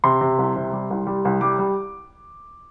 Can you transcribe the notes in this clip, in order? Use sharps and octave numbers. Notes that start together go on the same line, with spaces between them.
C3 C6
C3
C2
C3
G3
C2
G3
C2
G3 D6
G3